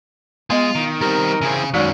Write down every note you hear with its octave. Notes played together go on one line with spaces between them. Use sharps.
G#3 B3 F4 D#5
D#3
G3 C4 A#4
C#3 E3 C4 G#4
F#2 D#3 F#3 G#3 C#4 F#4 D5 C#6